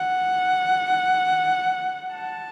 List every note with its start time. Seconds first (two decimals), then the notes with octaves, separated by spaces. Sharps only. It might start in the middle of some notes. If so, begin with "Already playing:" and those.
Already playing: F#5
2.14 A5